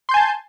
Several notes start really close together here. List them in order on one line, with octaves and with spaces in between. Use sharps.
C6 G6 G#5 A5